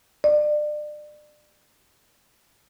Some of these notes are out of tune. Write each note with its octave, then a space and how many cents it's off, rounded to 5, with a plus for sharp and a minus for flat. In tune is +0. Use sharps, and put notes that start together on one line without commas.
D5 +30